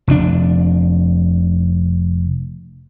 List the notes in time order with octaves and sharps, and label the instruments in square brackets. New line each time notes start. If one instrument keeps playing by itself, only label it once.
[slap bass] F1 A#2 D4